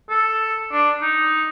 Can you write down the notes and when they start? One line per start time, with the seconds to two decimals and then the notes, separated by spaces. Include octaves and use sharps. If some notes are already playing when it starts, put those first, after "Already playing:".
0.10 A4
0.72 D4
1.02 D#4